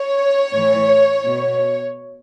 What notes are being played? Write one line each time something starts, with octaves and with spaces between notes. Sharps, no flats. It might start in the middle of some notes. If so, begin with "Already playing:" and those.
Already playing: C#5
A2 E3
B2